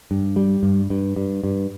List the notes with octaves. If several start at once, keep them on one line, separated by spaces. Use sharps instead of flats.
G2
G3
G2
G2
G2
G2